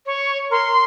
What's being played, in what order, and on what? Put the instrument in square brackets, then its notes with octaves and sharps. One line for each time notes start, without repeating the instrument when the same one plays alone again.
[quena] C#5
[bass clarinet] A#4 [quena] C6